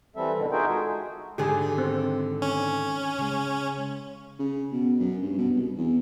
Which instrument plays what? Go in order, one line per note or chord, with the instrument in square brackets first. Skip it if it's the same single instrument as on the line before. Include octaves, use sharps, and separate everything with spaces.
[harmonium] E3 G3 C4 A4 E5
B2 D3 D#3
D#4 F4 F#4 G#4 E5 G5
G#3 F#4 G#4 A4
[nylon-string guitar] G#2 D3 D#3 [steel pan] G4 G#4
[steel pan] C4
[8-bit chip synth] C#4
[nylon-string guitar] C#3 G#3
[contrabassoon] C#3
B2
F#2
G2
B2
C2
E2